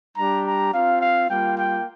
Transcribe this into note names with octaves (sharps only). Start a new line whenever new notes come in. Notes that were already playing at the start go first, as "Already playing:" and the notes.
G3 D4 G4 A#5
A#5
C4 F4 F5
F5
G3 A#3 F4 G5
G5